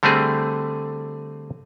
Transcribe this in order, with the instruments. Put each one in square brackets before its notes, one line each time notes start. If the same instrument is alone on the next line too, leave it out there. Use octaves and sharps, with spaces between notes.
[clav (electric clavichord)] D3 G3 A3 C4 G#4